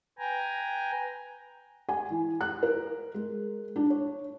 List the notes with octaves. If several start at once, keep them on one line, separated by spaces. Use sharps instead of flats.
B4 G5 G#5 A#5
G#5
E3
F#6
A#4
G#3
D4
C#5